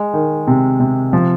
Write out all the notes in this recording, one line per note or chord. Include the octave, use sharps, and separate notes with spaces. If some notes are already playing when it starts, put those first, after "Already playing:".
Already playing: G#3
D#3
C3
C3
F3